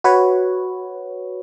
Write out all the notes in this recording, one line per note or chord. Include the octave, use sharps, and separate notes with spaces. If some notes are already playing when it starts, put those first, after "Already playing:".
F#4 B4 C#5